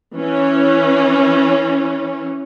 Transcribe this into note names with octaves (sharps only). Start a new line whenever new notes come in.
E3 C#4